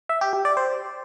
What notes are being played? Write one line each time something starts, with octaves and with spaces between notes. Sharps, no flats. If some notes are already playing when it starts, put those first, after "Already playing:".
E5
G4
G4
D5
C5